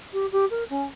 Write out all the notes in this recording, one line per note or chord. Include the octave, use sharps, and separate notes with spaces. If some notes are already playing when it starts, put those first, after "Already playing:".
G4
G4
A#4
C#4